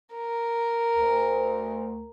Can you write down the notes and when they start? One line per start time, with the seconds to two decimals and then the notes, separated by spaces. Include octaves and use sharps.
0.15 A#4
0.96 D2